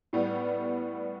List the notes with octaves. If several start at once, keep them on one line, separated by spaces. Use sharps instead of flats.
A2 G3 B3